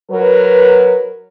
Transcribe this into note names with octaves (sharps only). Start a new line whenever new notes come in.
F#3 A#4 B4